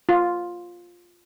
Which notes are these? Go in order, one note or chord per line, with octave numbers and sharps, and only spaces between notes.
F4